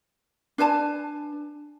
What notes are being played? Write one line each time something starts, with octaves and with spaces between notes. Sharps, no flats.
D4 B4 G#5 A5